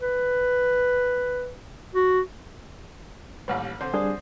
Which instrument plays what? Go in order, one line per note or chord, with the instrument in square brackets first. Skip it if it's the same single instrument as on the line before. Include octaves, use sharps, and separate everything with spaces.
[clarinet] B4
F#4
[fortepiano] A1 D#2 G3 [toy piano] B4 C#5 F#5
[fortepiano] D3 C4 C5
[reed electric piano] G3 D4 G#4 [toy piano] A#4 D5 D#6